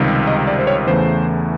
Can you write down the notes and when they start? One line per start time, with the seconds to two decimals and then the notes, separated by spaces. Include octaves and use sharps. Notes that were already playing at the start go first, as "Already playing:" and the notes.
Already playing: C#2 C3 D#3 G3
0.27 D#5
0.47 D5
0.59 C5
0.67 C#5
0.87 E2 C#3 E3 A3 C5